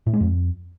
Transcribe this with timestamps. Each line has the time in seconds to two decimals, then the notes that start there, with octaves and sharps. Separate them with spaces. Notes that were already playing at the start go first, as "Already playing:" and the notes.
0.07 A2
0.14 G#3
0.21 F2